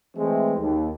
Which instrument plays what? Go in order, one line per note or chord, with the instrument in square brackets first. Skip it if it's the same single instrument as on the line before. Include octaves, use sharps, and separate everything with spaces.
[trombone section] E3 G#3 A3 C4
D#2